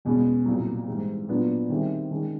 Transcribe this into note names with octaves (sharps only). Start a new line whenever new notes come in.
E2 B2 G#3 C#4 F#4
C2 A#2 F#3
G#2 E3 G3
A#2 F#3 B3 D4 F4
D#3 G3 C4 E4 G#4
D#3 G#3 C#4